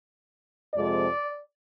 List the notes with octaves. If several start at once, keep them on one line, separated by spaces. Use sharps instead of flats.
F2 C3 F3 G#3 D5